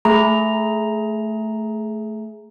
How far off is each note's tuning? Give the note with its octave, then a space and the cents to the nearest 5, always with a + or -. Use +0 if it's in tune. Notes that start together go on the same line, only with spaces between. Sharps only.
A3 -5 G#4 +20 A#5 +0